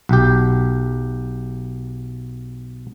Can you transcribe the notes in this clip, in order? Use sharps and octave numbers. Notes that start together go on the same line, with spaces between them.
B1 G4